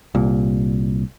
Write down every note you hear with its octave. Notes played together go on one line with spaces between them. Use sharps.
C2 A#2